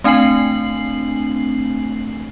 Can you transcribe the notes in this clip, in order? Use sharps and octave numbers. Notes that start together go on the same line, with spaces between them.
A3 C4 D4 G#5 C7 F#7